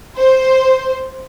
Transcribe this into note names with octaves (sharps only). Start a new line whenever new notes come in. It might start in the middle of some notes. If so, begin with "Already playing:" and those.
C5